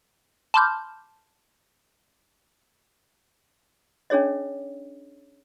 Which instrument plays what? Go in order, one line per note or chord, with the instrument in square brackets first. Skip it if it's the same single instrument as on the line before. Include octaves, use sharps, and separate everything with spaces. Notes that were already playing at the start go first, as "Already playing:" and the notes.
[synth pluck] A5 B5 C6 D6 F6 G6
[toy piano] C#4 D4 G#4 C#5 D#5